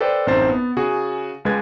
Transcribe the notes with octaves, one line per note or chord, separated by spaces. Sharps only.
A4 B4 C5 D5 G5 A5
A1 F#2 C4 D#4 C5 A6
B3
C#3 F#4 G#4
C#2 G#3 B4 G#6 A6